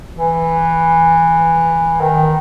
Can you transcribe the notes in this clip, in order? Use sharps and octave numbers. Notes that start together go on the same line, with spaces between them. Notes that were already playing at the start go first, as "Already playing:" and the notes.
E3
D#3